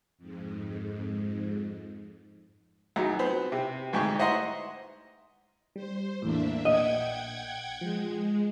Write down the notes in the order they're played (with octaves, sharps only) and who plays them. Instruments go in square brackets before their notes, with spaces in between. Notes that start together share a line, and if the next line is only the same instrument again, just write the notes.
[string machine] F2 G#2
[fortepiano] C#2 F#3 D#4
B3 C4 C5 B5
C3
D2 G#2 G4 G#5 C#6
C5 D#5 E5 F#5 A#5 C6
[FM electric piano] G3 [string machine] C5
[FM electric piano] E2 A2 [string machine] A#3 D4 E5
[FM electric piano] A#1 [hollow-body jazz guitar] D#5 [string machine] F#5 G5 G#6
[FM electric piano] F3 [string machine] G#3